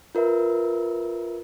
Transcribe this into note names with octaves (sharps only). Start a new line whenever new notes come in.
F4 A#4 B4 E5